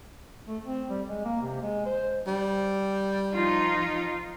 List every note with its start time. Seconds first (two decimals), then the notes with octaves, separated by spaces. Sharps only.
0.48 A3
0.64 C4
0.90 G3
1.09 G#3
1.25 A#3
1.42 C3
1.62 G#3
1.86 C5
2.27 G3
3.34 F3 D#4 F4